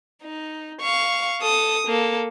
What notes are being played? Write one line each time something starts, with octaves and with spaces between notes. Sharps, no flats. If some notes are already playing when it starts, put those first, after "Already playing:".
D#4
F5 C#6
A4 D#6
A#3 A4